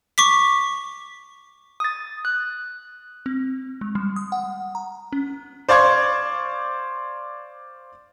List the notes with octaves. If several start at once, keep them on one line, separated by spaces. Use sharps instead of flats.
C#6 D6 B6
D#6 A6
F#6
C4
G#3
G3
D#6
F#5
A#5
C#4
C5 D5 F5 C6 C#6 G#6